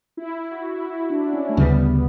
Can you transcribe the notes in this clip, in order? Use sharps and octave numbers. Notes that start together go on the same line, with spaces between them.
E4
F#4
E4
D4
C#4
A3
D2 C#3 G3 B3